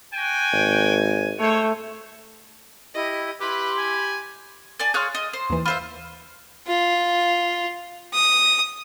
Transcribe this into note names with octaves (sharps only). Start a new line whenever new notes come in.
F#4 G5 G#5
G#1
A3 C5 C#5
E4 G4 D#5
E4 G4 B4 B5 C6
G#5
D5 G#5 A5
G#4 C#5 F5 C6 F6 F#6
D#5
C5
D#2 E3
F4 C5 E5 B5
F4
D#6